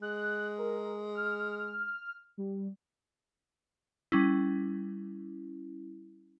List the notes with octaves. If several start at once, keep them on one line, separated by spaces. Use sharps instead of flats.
G#3 F#6
A#4
F6
G3
G3 C#4 E4